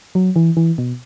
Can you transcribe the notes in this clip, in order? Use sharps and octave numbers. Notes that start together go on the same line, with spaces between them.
F#3
E3
E3
B2